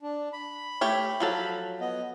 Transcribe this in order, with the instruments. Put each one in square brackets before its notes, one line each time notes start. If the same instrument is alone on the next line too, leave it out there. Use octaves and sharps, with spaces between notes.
[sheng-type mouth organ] D4
B5
[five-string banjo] A3 G4 C#5
F3 F#3 A4
[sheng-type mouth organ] B3 D#5